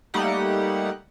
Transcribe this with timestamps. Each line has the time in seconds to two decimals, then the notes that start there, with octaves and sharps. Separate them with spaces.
0.14 G3 A3 A#3 D#4 G4 F#5